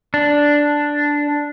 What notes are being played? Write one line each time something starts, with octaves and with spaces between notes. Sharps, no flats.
D4